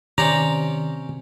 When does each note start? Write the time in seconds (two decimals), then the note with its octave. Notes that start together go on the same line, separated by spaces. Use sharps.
0.18 C3 D#3 C#4 G4 D5 A#5